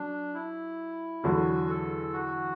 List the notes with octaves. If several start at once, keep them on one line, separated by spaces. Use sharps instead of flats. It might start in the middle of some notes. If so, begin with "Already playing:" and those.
Already playing: F#3 D4
E4
E2 D3 F#3 F#4
A4
F#4